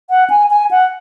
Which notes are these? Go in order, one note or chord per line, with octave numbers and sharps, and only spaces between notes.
F#5
G#5
G#5
F#5